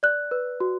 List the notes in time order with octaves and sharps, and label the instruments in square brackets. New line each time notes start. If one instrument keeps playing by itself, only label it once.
[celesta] D5 F#6
B4
F#4